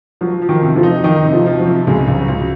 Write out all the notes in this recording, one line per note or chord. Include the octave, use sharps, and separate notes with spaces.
F3 F#3
F3
D#3
C3
F3
D#4
D#3 D#4
C3
F3
F3
F#3
C3
C#2 G#3
C#2
F#3
C#2